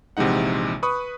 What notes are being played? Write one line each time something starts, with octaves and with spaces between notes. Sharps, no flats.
A#1 C3 E3 G#3 D#4 F#5
B4 B5 C#6 D#6 F#6